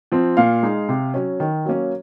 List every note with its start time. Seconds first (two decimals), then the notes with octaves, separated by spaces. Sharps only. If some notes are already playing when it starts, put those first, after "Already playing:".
0.12 F3 C4
0.37 A#2 F5
0.63 G#3 D#4
0.89 C3
1.14 F#3 C#4
1.40 D#3
1.65 F#3 A#3 C#4